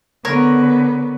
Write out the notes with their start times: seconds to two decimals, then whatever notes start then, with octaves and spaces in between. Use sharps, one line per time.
0.25 D3 B3 A#4 C#5